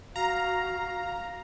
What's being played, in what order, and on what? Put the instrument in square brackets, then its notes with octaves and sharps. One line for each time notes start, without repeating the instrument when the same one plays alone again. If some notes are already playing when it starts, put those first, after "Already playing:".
[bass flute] F#4 [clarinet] F5 [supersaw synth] A#5